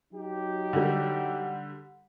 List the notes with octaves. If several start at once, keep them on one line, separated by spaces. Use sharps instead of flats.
F#3 D#4 G4
D3 G3